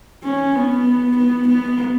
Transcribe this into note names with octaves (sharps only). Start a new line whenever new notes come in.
C#4
B3
B3
B3